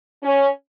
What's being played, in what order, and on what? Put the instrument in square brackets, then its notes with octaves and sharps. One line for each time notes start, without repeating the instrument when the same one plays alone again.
[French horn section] C#4